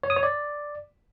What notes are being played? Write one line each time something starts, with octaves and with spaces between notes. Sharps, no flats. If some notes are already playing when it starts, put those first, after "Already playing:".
C#5
D#6
C#5
D5